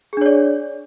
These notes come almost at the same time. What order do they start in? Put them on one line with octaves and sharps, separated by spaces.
G#4 D4 C#5 D5